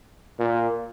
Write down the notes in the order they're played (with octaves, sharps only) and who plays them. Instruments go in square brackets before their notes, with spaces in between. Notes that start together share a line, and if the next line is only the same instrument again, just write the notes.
[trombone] A#2